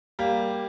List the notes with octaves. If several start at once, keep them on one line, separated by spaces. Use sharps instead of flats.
G3 A#3